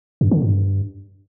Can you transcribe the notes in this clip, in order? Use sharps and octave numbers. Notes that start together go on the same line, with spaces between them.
F#2
D3
G2